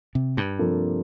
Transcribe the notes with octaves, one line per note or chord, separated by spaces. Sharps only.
C3
G2
C3 F3 A#3 D4 A4